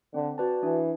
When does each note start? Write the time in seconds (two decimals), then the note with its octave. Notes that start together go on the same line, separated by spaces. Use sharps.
0.14 D3 C4
0.38 F#4 B4 D5 A5
0.63 E3 D4